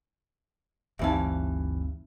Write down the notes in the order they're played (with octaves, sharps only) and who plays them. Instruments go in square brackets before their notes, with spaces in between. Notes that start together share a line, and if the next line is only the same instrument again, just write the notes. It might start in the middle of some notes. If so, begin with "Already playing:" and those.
[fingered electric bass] G1 D2 C4 [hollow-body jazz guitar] G2 E3 F5 [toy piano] D#4 E5